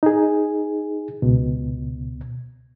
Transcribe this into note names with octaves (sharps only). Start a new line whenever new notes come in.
D#4 G#4
C#2 B2